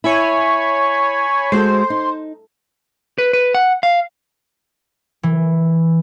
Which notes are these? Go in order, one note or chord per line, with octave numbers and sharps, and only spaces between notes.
E4 C#5 G#5 B5
G#3 F#4 A4 C5
D#4
B4
B4
F#5
F5
E3